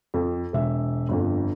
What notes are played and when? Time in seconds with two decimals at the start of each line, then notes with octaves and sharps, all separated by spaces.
0.14 F2
0.53 E1 E5
1.09 G1 F2